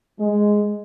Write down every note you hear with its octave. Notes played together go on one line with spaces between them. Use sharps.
G#3